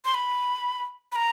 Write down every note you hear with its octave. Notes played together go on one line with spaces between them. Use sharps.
C6
B5
B5
A#5